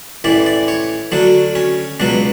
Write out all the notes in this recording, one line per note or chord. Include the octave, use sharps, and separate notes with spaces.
A1 A2 E3 D5
D5
C#5
D2 D3 F#3 D4
C#4
C#2 B2 F#3 D4